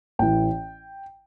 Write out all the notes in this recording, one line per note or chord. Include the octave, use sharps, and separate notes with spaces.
A1 A2 E3 G5